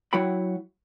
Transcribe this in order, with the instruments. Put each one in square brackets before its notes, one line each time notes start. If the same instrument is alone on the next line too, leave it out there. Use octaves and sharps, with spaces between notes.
[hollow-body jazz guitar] F#3 E4 F#4 G5 B5